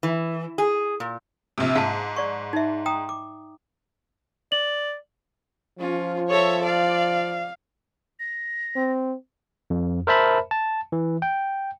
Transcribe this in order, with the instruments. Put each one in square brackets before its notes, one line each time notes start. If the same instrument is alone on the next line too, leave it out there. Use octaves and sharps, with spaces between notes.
[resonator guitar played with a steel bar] E3
G#4
A#2
[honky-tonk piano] A#1 C3
[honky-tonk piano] G#2 [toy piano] F5 A5
[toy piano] D5 C#6
D#4 E5
G5 A#5 D#6
D6
[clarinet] D5 [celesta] F#7
[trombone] F3 [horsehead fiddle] C#4 F4
[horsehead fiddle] A4 E5 [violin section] C#5
[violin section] D5 [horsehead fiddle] F5
[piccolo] A#6
[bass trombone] C4
[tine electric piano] F2
A#4 C5 E5 A5 B5
A5
E3
G5